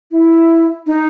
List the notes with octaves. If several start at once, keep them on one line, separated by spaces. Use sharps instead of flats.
E4
D#4